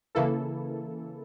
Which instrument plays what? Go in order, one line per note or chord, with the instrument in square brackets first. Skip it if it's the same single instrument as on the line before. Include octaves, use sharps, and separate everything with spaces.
[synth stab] C#3 E3 A#3 E4 A4